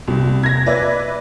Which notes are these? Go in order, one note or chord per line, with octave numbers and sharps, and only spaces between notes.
C2
G#6 A#6
B4 D5 E5